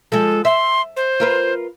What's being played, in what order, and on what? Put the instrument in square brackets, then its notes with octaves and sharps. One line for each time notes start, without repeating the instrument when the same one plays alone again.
[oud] F3 G#3 [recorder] A4
[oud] E5 [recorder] C6
[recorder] C5
[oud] F4 A#4 B4